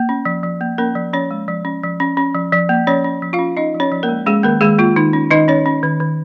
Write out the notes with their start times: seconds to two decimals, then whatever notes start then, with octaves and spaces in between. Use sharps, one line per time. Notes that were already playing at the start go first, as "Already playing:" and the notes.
Already playing: A#3
0.09 C#4
0.25 F3
0.43 F3
0.61 A#3
0.78 A#3 C#4 A#4
0.95 F3
1.13 F3 C#4 C#5
1.31 G#3
1.48 F3
1.65 C#4
1.83 F3
2.00 C#4
2.17 C#4
2.35 F3
2.52 F3
2.69 A#3
2.87 F3 C#4 C#5
3.04 C#4
3.22 F3
3.33 F4 F5
3.39 C#4
3.57 C#4 D#4 D#5
3.74 F3
3.80 C#4 C#5
3.92 F3
4.03 A#3 A#4
4.09 G#3
4.26 G#3 C#4 G#4
4.43 D#3 A#3 A#4
4.61 D#3 G#3 G#4
4.79 A#3 F4
4.96 D#3 D#4
5.13 C#4
5.31 D#3 D#4 D#5
5.48 C#4 C#5
5.66 C#4
5.83 D#3
6.00 D#3